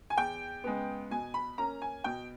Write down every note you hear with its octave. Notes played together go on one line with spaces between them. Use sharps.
G#5
E2 G5
C#3 G#3 B3
B2 G#5
B5
A#3 C#4 A#5
G#5
B2 G5